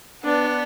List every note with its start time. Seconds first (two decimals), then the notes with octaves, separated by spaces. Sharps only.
0.23 B3 D4